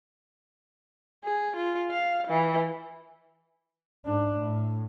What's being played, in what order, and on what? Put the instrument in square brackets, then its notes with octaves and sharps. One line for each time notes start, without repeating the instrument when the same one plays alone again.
[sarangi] G#4
F4
F5
E3
[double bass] G#2 D4
A2